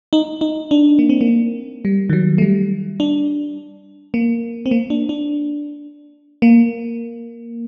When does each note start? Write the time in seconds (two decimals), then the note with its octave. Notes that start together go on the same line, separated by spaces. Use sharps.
0.13 D#4
0.41 D#4
0.71 D4
0.99 A#3
1.09 C4
1.21 A#3
1.85 G3
2.10 D#3
2.13 F#3
2.38 A3
2.42 G3
3.00 D4
4.14 A#3
4.66 C4
4.71 A#3
4.90 D4
5.09 D4
6.42 A#3